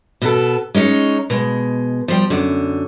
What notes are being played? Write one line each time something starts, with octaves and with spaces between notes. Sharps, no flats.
B2 B3 A4
G#3 C#4 D#4 C#5
B2 G#3
F3 G3 G5
F#2 D3